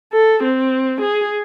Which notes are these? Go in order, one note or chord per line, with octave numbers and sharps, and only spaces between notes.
A4
C4
G#4